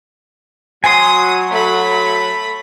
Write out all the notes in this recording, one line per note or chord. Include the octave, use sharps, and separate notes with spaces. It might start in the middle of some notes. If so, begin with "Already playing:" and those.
F#3 G#5 C6 D#6
A3 B5